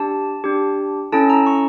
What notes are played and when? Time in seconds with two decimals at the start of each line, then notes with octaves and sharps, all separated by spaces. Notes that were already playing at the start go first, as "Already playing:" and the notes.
Already playing: D4 G4 A5
0.44 D4 G4
1.12 C#4 E4 A4 A5
1.30 A#5
1.46 C#6